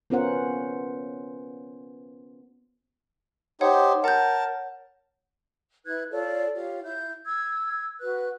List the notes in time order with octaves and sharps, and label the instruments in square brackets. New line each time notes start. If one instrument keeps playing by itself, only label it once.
[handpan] B3 C#4 F4 A#4 C5 F#5
[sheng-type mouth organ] D#4 G4 C5 [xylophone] C#5 F#5
[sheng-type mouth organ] A#4 A5 [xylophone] F#5 G6
[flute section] E4 B4 F#6 G#6
F4 A4 C#5 D5
F4 G4 C#5
E4 G6
E6 G#6
F#4 B4 F#6